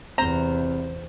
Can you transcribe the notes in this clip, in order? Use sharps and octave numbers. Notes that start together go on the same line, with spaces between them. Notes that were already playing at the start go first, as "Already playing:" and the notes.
E2 C3 C5 A#5